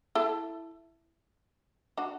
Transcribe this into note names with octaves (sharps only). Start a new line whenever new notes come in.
E4 A4
D4 F#4